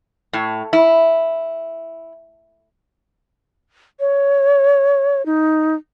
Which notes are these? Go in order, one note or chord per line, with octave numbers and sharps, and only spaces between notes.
A2
E4
C#5
D#4